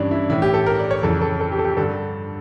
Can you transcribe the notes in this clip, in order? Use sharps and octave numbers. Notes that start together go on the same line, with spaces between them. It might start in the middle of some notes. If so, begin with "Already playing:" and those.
Already playing: G2 E3 C#4 D4
E4
A2 E3 E4
G4
A4
A#4
D5
C#5
F2 C#3 E3 A4
A4
A4
G4
A4
G4
G2 D3 A4